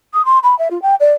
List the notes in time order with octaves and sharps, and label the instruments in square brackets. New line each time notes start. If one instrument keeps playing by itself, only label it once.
[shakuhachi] D#6
C6
B5
E5
F4
G5
D5